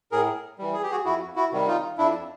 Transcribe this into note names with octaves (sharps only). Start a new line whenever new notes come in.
A2 G#4 A#4
E3 G3
G#4
G4
F#4 G#4
F2 E4 F#4
E4 F#4
C3 D#3 G3
D#4 F4
F2 D4 E4